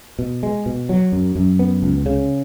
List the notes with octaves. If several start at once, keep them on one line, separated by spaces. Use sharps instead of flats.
B2
G#3
B2
F#3
F#2
F#2
B3
C#2
C#3